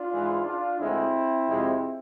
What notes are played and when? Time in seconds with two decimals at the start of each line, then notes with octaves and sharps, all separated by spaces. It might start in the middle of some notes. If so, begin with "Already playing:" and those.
Already playing: D4 F4
0.12 G#2 E3 G#3
0.46 D4 F4
0.79 D2 D3 G#3 C4 E4
1.48 F2 C3 F3 G#3